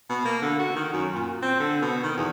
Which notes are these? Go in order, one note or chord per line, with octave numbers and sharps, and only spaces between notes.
B2
A#3
D3
F#4
D#3
F#2
A#2
C4
D3
B2
D#3
E2